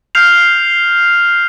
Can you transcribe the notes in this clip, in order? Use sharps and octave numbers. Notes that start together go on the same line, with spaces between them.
F6 G6 C7 F7